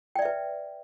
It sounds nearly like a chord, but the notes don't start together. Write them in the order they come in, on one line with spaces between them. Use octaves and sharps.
G5 D5 E5 B4